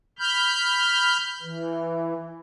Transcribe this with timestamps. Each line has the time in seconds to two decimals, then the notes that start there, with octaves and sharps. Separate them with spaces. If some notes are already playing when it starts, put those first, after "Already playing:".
0.19 B5 F6 G6
1.42 E3